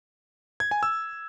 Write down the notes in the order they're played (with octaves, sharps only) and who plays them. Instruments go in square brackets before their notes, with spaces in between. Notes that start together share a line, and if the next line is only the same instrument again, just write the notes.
[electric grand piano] G#6
G#5
E6